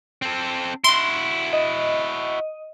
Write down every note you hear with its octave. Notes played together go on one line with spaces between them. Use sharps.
C4 A4
E4 F#4 C6
D#5